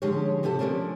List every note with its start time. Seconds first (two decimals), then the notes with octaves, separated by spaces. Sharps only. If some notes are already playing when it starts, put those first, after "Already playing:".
0.02 D3 F3 G#3 C#4 G4 C#5
0.43 C3 B3 F#4 G4 A4
0.59 F3 F#3 A3 A#3 C#4 D4